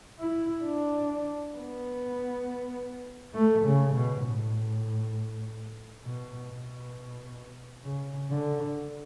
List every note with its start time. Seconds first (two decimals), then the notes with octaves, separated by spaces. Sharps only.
0.19 E4
0.64 D4
1.55 B3
3.35 A3
3.65 C#3
3.95 B2
4.25 A2
6.04 B2
6.49 B2
7.84 C#3
8.30 D3